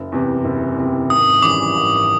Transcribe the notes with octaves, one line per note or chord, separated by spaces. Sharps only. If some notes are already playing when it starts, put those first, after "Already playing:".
Already playing: F#1
E2 C3
F#1
E2 C3
G#1 D#6
F#2 C#3 E3 G3 D6
G#1